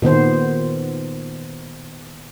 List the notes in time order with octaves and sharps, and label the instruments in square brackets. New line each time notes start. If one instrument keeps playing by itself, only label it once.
[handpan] A#2 D#3 B3 C5